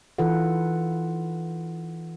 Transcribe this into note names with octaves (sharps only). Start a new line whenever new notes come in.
E3 D#4 F4 A4 B4 F#5